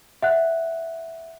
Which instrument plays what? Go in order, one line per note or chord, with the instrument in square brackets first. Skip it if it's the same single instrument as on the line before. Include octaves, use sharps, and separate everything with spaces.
[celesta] E5 F#5 F#6